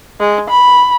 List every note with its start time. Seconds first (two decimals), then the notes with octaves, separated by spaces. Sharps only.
0.20 G#3
0.50 B5